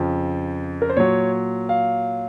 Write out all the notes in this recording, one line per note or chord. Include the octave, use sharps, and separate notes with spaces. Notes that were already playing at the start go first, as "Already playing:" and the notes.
Already playing: F2 C#3 F3
A#4
C5
A#2 F#3 C#5
F5